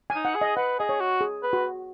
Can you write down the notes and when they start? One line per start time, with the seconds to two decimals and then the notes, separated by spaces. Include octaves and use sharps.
0.10 G#5
0.15 D#4
0.25 F#5
0.35 G#4
0.41 D#5
0.57 B4 F#5
0.79 G#4 D#5
0.89 C#5
1.00 F#4
1.21 G#4
1.43 B4
1.53 F#4